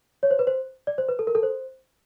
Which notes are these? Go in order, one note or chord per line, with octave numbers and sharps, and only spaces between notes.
C#5
C5
B4
C5
D5
C5
B4
A4
A#4
A4
C5